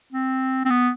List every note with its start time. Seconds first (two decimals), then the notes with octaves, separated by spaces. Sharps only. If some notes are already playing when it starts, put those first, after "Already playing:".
0.12 C4
0.65 C4
0.70 B3